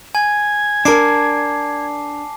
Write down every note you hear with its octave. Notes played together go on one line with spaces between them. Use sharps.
G#5 G#6
D4 A#4 A5 D6 C7